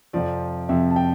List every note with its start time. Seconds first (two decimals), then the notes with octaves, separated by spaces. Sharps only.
0.13 F2 C3 F3 D5
0.69 F2 C3 F3 E5
0.90 A5
0.96 G5